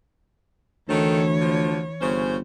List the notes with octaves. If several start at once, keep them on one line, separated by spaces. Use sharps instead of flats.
D2 D#3 E3 D#4 A4 C#5
D3 F3
G1 C#3 C#4 C5